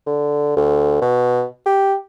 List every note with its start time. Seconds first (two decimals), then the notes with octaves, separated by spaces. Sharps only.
0.06 D3
0.56 D2
1.01 B2
1.66 G4